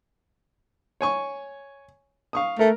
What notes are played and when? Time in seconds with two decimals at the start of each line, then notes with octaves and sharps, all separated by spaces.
1.01 C#5 G#5 C#6
2.33 F5 C#6 D#6
2.59 A3 A#4